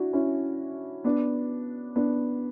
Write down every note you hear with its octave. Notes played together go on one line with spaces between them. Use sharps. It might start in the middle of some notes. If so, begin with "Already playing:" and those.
Already playing: D4 E4 F#4
C#4 E4
B3 D4
B3 D4